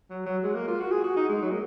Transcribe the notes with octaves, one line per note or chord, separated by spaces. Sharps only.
F#3
F#3
G#3
A#3
F4
F#4
G#4
F#4
D#4
G#3
F#3
A#3